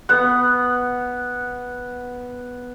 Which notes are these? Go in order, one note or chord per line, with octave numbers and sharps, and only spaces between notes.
B3 F#5